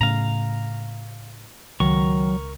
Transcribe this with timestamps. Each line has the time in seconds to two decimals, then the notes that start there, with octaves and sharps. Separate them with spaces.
0.01 A2 C#3 F5 A#5
1.80 C#2 D#3 F#3 A#4 C#6